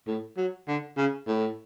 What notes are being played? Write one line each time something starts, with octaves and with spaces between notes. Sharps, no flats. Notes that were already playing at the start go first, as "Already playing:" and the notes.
A2
F#3
D3
C#3
A2